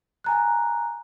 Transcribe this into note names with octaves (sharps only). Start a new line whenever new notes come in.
G#5 A#5 F#6